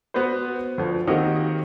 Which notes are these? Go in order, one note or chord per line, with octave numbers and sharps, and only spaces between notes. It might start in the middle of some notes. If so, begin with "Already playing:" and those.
B3 F#4 B4 C5
D2 F3
D#3 A#3 C4 F#4 G4 D#5